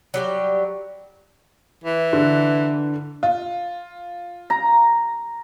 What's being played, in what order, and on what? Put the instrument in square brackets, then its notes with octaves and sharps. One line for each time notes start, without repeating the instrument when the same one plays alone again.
[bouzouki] F#3 G3 G4
[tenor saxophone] E3
[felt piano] D3
[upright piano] F4
[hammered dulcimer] A#5